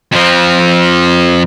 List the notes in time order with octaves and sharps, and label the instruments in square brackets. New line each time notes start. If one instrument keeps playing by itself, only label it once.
[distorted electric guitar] F2 F3